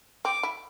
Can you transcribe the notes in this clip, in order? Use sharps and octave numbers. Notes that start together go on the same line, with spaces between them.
C4 D6
E4